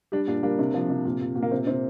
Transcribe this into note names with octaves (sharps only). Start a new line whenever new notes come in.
G3 D4 G4
A#2 D4 G4
G3 A#3 D4
C3
F3
C3
A#2
A#2
A#2
A#3
C3 C4
C3 C4